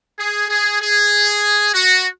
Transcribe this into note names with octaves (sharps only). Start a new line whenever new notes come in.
G#4
G#4
G#4
F#4